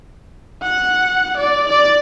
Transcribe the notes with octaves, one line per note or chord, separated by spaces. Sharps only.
F#5
D5
D5